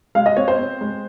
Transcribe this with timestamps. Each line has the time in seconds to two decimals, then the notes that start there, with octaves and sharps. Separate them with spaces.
0.15 G#3 F5
0.26 D#5
0.37 C4 C#5
0.48 C5
0.59 C4
0.81 G#3